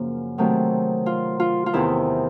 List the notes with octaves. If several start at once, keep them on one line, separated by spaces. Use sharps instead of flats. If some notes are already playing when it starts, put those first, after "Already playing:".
Already playing: F#2 C#3 F3 A#3
C3 D#3 F#3 A3 C4
F4
F4
F4
E2 C3 D#3 E4